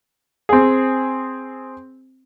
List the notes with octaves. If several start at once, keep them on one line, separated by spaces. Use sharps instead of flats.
C4 G#4